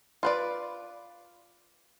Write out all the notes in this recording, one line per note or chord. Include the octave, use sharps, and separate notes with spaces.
F4 B4 D5